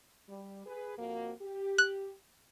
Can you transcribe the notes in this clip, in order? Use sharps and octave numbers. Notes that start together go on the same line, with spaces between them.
G3
G#4 B4
F2 A#3 F#4
G4
F#6